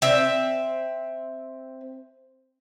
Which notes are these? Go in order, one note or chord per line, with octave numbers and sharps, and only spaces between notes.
C4 E5